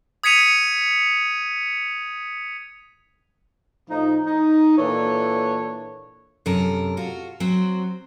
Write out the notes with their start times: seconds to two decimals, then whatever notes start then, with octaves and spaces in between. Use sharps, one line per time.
0.24 D#6 G#6 B6 C#7 D#7 F7
3.90 A2 F3 D#4
4.27 D#4
4.78 A#2 E3 D4 A4 C#5
6.46 F#2 C3 A4 A#4
6.97 F4 F#4
7.40 F#3 C4 F#4